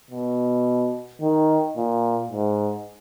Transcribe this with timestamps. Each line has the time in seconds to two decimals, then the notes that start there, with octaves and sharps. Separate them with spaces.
0.11 B2
1.21 D#3
1.77 A#2
2.32 G#2